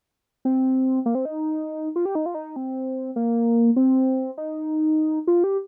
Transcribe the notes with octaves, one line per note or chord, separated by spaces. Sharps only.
C4
A#3
C4
D#4
F4
G4
D#4
F4
D#4
C4
A#3
C4
D#4
F4
G4